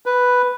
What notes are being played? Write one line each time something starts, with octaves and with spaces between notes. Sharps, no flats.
B4